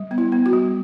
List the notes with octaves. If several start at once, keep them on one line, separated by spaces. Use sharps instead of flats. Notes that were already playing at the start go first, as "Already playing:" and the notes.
Already playing: G3
B3
E4
B3
F#4
G3